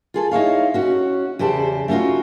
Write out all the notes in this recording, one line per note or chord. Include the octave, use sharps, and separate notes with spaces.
F4 G#4 A4
D#4 E4 C#5 F5
C#4 F#4
E2 C#3 G4 C5 A5
A3 C#4 D#4 F4 F#4